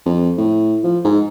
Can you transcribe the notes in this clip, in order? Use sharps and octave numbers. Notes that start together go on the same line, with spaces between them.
F2
A2
F3
G#2